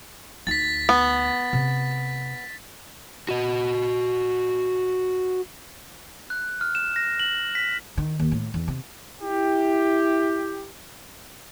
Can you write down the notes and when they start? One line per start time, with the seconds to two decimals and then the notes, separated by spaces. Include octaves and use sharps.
0.47 D2 D#4 A6 B6
0.89 B3
1.53 C3
3.29 F#4 D#5
6.30 F#6
6.61 F6
6.75 E7
6.96 A#6
7.20 F#7
7.55 B6
7.97 D#3
8.20 D#2
8.32 A2
8.54 E2
8.68 C3
9.21 E4 G4